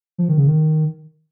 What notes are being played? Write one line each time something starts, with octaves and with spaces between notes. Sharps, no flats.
F3
D#3
C#3
D#3